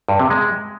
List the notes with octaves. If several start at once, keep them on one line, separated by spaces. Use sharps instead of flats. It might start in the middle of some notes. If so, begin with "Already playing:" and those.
G2
C3
G#3